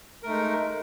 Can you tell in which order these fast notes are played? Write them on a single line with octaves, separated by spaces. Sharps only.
A#4 A3 D#4 G#3